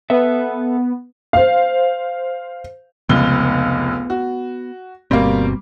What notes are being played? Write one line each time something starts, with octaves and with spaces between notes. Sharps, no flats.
B3 A4 B4 E5
C5 F5
F1 C#2 B3 G7
F#4
G1 B2 G3 A#3 C4